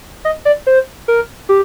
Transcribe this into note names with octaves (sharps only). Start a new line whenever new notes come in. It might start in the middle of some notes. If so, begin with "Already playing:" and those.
D#5
D5
C5
A#4
G4